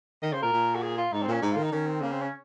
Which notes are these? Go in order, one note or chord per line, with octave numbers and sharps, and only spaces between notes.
D#3 D#5
C#3 C5
A#2 A#4
A#2
F#4
G#4
F4
G#2 D#4
C4
A#2 C#4
G#2 D#4
D#3 F4
D#4
D#3 C#4
C4
C#3 A#3
C4
C#4